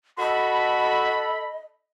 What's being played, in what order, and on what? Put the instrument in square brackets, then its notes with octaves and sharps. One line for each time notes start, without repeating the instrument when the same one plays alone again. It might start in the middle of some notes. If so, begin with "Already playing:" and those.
[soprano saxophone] F#4 [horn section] A4 B5 [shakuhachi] D#5